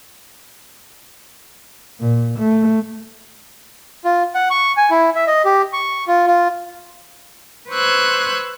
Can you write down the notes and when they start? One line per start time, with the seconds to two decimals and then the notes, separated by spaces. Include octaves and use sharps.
2.00 A#2
2.39 A3
4.05 F4
4.35 F#5
4.50 C#6
4.77 G#5
4.91 E4
5.15 E5
5.27 D#5
5.45 G4
5.73 C#6
6.08 F4
6.27 F4
7.70 B4 C5 C#6 E6 F#6 G#6